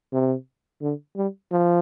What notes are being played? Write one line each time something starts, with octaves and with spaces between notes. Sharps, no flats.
C3
D3
G3
F3